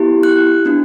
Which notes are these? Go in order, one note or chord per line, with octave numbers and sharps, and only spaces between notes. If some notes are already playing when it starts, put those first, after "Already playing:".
Already playing: B3 E4 G4
F#6
B3 D4 F#4